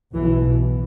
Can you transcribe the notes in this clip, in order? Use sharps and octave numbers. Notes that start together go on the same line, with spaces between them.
B1 B2 E3